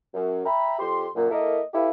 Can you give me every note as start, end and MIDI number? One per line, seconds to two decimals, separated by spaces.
0.14 0.43 42
0.45 0.79 76
0.45 0.79 79
0.45 0.79 82
0.45 0.79 83
0.79 1.07 41
0.79 1.07 67
0.79 1.07 84
1.15 1.27 42
1.15 1.27 46
1.31 1.60 58
1.31 1.60 64
1.31 1.60 69
1.31 1.60 70
1.31 1.60 75
1.74 1.90 64
1.74 1.90 67
1.74 1.90 69
1.74 1.90 71
1.74 1.90 77